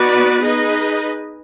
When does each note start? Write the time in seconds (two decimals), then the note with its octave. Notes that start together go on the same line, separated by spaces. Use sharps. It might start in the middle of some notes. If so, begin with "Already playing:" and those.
Already playing: B3 D#4 F#4 B4 D5
0.42 D#4 G#4 B4 D#5